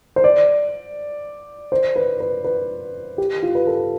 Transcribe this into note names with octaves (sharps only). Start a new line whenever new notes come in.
C5
D5
C5
B4
B4
B4
G4
F4
B4
A4